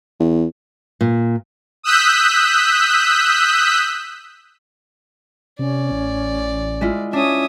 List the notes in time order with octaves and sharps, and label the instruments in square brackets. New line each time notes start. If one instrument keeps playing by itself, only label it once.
[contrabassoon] E2
[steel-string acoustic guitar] A#2
[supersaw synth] D#6 E6 F#6 G6 B6
[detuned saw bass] C3 [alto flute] C#4 [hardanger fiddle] D5
[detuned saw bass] A1
[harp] G#3 E4 F4
[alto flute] C#4 [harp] D4 [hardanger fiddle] E5 D#6